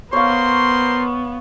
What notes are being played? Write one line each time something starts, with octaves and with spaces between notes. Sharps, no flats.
B3 A#4 C5 C#5 F5 C6